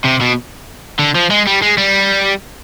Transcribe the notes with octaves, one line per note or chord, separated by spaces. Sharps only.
C3
B2
D3
F3
G#3
G3
G#3
G3